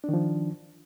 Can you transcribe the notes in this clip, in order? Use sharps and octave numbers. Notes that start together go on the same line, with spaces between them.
D#3 F3 D4